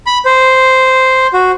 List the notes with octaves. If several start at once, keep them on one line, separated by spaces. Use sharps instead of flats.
B5
C5
F#4